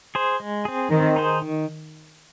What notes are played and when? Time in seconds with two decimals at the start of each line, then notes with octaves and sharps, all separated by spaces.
0.15 G#4 C5
0.40 G#3
0.65 C4 G#4
0.90 D#3 C4
1.16 D#4 G#4 C5
1.42 D#3